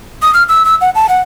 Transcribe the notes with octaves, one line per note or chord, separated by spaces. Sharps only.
D#6
F6
E6
E6
F#5
A5
F#5